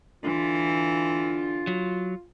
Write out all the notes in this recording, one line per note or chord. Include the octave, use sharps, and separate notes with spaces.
D3 E3 F4
F#3